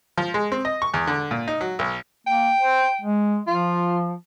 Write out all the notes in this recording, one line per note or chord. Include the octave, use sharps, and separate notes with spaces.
F3
G#3
C4
D#5
C#6
E2
D3
A#2
D#4
F#3
B1
A#3 G5
C5
G#3
F3 F4